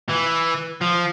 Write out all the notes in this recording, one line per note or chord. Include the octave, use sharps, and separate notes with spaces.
E3
F3